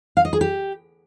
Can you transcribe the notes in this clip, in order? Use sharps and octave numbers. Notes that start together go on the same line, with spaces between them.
F5
D#5
G#4
G4